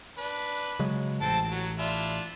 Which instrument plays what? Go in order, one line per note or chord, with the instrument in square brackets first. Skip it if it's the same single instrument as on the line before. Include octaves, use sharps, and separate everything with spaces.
[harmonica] D4 B4
[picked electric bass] C#3 F#3 G#3
[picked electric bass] A1 [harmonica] C4 A4 A5
[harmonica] F#3
D4 E4 F4